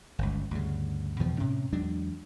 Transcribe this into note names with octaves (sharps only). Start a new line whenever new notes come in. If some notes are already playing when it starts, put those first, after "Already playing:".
G1 C#2
D2 G2 C#3
E2 B2 E3 F3
A2 C3 C#4
E2 F#3 G#3 D4